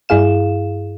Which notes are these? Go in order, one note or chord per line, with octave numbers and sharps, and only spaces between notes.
G2 E4 G#4 F5 E7